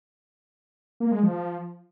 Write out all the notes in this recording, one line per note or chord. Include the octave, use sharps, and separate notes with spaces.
A#3
G#3
F3